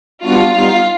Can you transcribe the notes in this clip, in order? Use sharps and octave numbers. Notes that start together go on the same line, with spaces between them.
G3 B3 D4 F4 F#4
G3 B3 D#4 F4